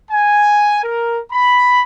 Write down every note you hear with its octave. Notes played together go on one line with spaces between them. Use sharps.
G#5
A#4
B5